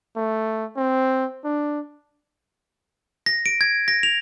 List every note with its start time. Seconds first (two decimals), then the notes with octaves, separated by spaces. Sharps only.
0.16 A3
0.76 C4
1.44 D4
3.26 A#6
3.46 D7
3.61 G#6
3.88 A#6
4.03 F7